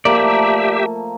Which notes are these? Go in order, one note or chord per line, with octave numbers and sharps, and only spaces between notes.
F3 A3 A#3 G4 D5 E5